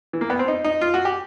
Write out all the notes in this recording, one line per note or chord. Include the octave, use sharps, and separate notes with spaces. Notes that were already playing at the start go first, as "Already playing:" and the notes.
E3
A#3
B3
C4
D#4
D#4
F4
F#4
G4